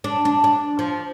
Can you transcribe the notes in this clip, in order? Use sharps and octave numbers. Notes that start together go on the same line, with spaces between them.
D4
D4
D4
F3